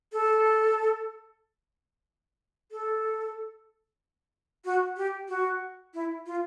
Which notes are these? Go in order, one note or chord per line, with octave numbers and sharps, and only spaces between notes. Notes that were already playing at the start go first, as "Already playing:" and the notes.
A4
A4
F#4
G4
F#4
E4
F4